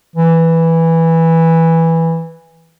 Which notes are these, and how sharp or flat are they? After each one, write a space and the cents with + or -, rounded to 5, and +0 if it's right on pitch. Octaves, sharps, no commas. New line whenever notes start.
E3 -5